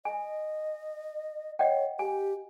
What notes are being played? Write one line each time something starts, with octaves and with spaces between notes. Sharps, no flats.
D#5 G#5
C#5 D#5 F#5 G5
G4 G#5